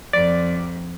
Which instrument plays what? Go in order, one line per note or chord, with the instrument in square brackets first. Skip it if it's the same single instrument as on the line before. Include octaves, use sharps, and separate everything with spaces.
[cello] F2 [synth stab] D5